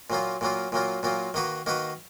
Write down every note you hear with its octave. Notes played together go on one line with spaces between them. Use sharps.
A#2 F#3 A#3 F4
A#2 F#3 A#3 F4
A#2 F#3 A#3 F4
A#2 F#3 A#3 F4
D#3 A#3 D#4 F#4 B4
D#3 A#3 D#4 F#4 B4